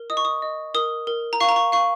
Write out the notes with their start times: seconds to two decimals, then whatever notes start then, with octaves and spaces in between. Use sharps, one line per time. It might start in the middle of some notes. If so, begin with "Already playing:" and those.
Already playing: A#4
0.10 D#5 D#6
0.17 C#6
0.25 D#6
0.42 D#5
0.74 A#4 D#6
1.07 A#4
1.33 A#5
1.40 F5 C#6
1.49 A#5
1.56 C#6
1.72 F5 C#6